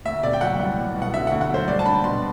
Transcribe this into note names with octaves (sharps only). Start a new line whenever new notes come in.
D2 E5
C3 D5
G5
F#3 F#5
C2
C2
B2
F#5
D3 E5
D2 F#5
F#5
F#3 C5
G3 D5
A5
D4 B5
B2 C6